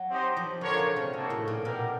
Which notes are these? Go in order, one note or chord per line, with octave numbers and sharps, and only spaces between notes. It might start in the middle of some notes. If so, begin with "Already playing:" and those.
Already playing: F#3
C4 D#4 G4 C5 D#5
F3
D3 D4 F4 A#4 C#5
C#3
C3
C#3 A#3 D#4 F#4 A4
A2
A#2
B2 D4 G4 A#4